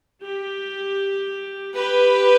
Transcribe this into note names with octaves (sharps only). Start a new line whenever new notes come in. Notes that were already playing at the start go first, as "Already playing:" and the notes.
G4
G4 B4